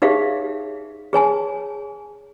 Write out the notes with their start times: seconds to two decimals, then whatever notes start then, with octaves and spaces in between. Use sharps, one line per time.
0.02 D#4 G4 G#4 C#5 E5 F5
1.13 G#4 C#5 G#5 A5